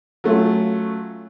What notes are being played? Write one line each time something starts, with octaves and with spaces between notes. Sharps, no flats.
F#3 A3 C#4 F4